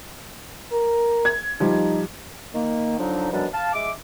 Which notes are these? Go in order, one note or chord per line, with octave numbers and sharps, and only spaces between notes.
A#4
G#6
F3 G3 D#4
D#3 A#3
D3 F3 F#3 D4 D#4
F#2 B2 F3 G3 D4
F5 A5
G#3 E5 D6